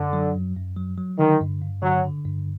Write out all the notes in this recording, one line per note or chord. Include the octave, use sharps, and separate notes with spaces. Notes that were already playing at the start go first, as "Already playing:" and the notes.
Already playing: F#2 D3
F#3
F#2
F#2
F#3
F#3
D3 D#3
G2
G2
D3 F#3
D3
G2